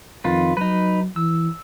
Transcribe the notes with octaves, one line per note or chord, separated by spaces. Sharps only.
F2 D#3 F4 B4
F#3 D#4 B4
E3 E6